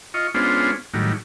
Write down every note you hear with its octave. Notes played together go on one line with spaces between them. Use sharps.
F4 D#5 C#6
G#3 B3 C#4 D4 F4 C5
A2 D#3 F#3 G3